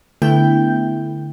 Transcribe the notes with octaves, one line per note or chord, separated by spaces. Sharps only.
D3 A3 B3 E4 G5 G6